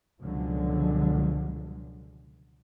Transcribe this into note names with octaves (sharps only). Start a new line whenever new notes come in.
C#2 B2 D3 F3 F#3 G#3